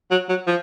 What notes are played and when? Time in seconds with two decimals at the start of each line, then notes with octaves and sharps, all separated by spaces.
0.11 F#3
0.29 F#3
0.47 F3